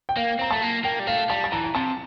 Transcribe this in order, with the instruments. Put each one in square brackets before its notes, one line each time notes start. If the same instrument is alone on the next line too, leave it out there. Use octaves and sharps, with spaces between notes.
[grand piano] G5
[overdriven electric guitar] A#3 [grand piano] F5
[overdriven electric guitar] C4 [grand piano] A#5
[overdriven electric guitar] A3 [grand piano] A5
[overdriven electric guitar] A#3
[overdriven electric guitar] A#3 [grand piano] G5
[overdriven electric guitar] G3
[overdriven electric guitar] A3 [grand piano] F5
[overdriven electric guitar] G3 [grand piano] A5
[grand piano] A5
[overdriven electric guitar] E3 [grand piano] A#5
[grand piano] A#5
[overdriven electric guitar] C3 [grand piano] A5